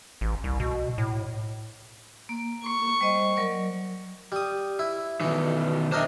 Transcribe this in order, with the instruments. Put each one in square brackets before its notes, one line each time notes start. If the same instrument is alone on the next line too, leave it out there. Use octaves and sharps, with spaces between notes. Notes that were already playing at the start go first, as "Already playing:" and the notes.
[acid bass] A1
C2
B2
A2
[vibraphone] A#3
[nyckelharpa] C#6
[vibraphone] G3 C5 D#5
F#3 A#4 D5
[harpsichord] G3 D#6
E4
[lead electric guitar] B2 D#3 [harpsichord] E3
[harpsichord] D4 A#4 D#5 [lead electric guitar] C5 E5